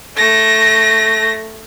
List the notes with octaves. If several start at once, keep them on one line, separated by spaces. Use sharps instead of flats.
A3 A#6